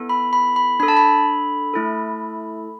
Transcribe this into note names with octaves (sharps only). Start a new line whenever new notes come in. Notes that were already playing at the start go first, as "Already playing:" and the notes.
Already playing: B3 E4 A4
B5
B5
B5
D4 A4 B5
A5
B5
A3 E4 A4